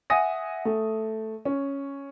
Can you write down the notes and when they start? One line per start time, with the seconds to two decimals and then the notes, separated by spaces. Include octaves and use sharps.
0.10 E5 F#5 G#5 D#6 A#6 D#7
0.65 A3
1.45 C#4